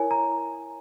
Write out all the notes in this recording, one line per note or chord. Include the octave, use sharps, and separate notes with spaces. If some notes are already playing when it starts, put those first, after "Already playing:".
Already playing: E4 A#4 C#5 G#5
A#5